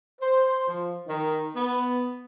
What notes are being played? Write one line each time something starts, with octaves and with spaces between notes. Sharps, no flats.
C5
F3
D#3
B3